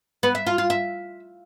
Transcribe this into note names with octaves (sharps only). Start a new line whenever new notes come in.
B3
E5
F4
F4
E5